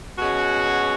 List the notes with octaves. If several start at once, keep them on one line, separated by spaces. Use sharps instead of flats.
B2 G#3 C#4 F#4